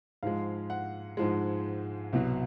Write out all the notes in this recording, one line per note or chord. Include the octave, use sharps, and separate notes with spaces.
G#2 F3 G#3 F5
F#5
G#2 F3 G#3
C2 B2 F#3